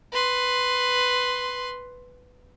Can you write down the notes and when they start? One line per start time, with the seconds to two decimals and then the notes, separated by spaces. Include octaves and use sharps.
0.12 B4 C6